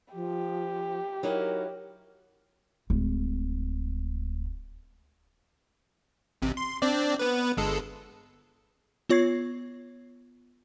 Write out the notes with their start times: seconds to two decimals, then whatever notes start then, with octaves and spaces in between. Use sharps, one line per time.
0.13 F3 G4
1.23 F#3 D#4 E4 A#4
2.90 D1 G#3
6.42 A1 C3
6.57 C6
6.82 C4 D4 D5
7.19 B3 B4
7.57 G1 G#3 A4
9.09 B3 F4 C#5 C#6 G#6 C7